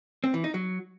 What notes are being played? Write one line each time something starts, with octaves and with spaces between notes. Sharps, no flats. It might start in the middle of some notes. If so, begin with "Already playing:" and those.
C4
E3
D#4
F#3